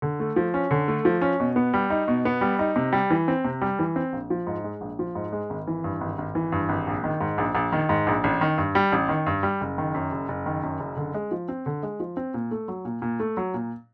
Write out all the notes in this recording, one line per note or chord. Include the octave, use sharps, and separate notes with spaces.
D3
A3
F3
C#4
D3
A3
F3
C#4
B2
B3
G3
D#4
B2
B3
G3
D#4
C3
G3
E3
C4
C3
G3
E3
C4
A#1
F3
G#2
G#3
A#1
F3
G#2
G#3
G#1
E3
G2
G#1
G#1
E3
G2
G#1
A#1
D#3
G#2
A#1
A#1
D#3
G#2
A#1
A1
D#3
G2
G3
A1
D#3
G2
G3
F#1
D#3
F#2
F#1
F#1
D#3
F#2
F#1
D3
G#3
F3
C4
D3
G#3
F3
C4
A#2
A3
F#3
A#2
A#2
A3
F#3
A#2